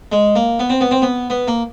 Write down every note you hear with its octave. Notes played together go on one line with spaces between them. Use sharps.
G#3
A#3
B3
C4
B3
C4
B3
B3
A#3